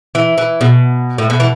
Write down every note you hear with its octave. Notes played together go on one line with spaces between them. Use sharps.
E3
E3
B2
A2
B2
E3